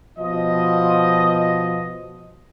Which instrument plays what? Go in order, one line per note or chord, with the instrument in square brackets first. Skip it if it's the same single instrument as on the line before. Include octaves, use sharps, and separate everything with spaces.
[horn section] B2 F3 D#5